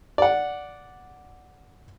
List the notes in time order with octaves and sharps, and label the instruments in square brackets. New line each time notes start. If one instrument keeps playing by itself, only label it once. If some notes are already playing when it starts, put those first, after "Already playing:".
[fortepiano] D5 F#5